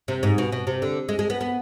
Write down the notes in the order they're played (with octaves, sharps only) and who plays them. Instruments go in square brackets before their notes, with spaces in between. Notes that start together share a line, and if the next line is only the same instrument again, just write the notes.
[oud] C3
G#2
B2
B2
C3
D3
G#3
G#3
B3
B3